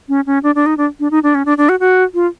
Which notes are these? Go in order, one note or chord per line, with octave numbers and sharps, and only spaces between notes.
C#4
C#4
D4
D4
D#4
D4
D4
D#4
D4
C#4
D4
D4
F#4
F#4
F4